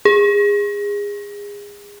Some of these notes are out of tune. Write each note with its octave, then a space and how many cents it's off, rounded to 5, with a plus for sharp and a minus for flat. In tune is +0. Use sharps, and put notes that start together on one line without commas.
G#4 -25